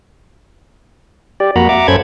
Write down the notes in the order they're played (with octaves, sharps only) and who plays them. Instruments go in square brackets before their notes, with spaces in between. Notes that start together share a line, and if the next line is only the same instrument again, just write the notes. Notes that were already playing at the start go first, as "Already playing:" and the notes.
[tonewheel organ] G4 D5
F2 A#3 F#4 F#5 A#5 B5
E5 F#5 A#5 D6
F#2 C#4 A4 C5 B5 G#6